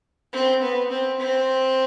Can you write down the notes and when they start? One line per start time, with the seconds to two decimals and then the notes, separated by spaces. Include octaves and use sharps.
0.33 C4
0.62 B3
0.91 C4
1.20 C4